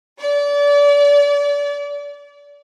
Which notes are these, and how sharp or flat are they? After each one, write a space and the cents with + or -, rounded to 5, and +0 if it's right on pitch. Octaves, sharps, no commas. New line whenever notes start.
D5 -35